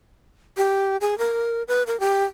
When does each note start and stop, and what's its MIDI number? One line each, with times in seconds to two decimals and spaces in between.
0.57 0.97 67
1.01 1.18 68
1.18 1.63 70
1.68 1.83 71
1.87 1.99 70
2.00 2.24 67